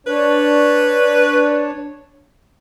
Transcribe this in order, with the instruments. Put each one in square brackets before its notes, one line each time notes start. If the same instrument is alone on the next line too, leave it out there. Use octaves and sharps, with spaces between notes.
[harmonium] D4 C#5 [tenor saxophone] B4